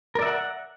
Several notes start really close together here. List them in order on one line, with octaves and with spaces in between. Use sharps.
A#4 D5 E5 F#5